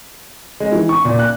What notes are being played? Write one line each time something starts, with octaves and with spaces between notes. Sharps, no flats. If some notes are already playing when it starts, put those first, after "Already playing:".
G#3
E3
C#6
A#2
F#6